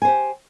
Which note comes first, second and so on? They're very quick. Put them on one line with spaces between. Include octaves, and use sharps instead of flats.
G#5 C5 G4